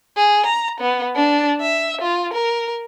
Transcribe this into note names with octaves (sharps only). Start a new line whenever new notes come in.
G#4
A#5
B3
D4
E5
F4
A#4